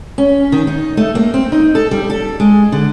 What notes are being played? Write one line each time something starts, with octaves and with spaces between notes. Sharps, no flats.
C#4
D#3
D#4
A3
A#3
C4
D#4
A4
G3
A4
G#3
D3